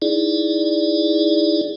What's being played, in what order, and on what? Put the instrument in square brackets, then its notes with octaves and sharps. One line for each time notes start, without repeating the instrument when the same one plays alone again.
[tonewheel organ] D#4 E4 G#4 D5